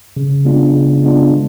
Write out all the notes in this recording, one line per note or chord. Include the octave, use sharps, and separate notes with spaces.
C#3
G#3 B3 D4 F4
C#3
G#3 B3 D4 F4
D3